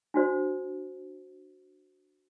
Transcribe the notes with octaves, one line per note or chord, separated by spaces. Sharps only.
D4 F#4 C5